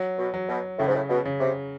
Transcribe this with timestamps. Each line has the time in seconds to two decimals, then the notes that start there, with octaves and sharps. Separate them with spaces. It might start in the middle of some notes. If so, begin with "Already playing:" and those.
Already playing: F#3
0.19 B2
0.34 F#3
0.49 B2
0.79 A2 C#3
0.87 G#2
0.95 A2
1.09 B2
1.25 C#3
1.40 C3